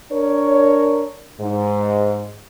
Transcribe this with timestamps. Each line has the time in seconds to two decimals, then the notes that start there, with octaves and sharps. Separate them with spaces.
0.12 D4 A#4 C#5
1.41 G#2